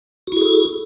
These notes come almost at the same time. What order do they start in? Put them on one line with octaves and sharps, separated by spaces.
F#4 E4 G#4 A4